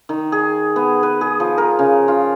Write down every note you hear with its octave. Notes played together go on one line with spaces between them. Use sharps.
D#3
G#4
B3
B4
G#4
F3
A#4
C#3
F4